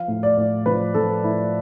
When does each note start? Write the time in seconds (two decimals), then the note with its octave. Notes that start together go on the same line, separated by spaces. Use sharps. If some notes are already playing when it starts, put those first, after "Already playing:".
Already playing: F3 F5
0.08 A2
0.23 D5
0.37 A2
0.66 F3 B4
0.94 F3 A4
1.23 A2 E4